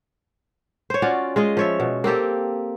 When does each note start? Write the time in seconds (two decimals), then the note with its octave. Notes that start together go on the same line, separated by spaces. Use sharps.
0.90 C5 C#5
1.02 C#4 F4 F#4 D5
1.36 G#3 F4 D#5
1.57 F3 C#5 E5
1.80 B2
2.04 A#3 C4 G4 A4